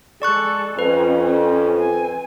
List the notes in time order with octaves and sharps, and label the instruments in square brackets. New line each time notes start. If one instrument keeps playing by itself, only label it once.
[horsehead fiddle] G#3 A4 [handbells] D5 C#6 F#6
[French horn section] F2 [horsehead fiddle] C#4 [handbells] B4
[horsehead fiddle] C4 G#5